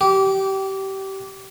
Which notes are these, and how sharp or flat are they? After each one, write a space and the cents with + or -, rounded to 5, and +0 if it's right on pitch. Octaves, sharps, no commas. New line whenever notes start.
G4 -25